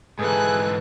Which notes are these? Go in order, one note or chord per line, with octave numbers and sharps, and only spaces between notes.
G#2 E3 G#4 A4 B4 D#6 F#6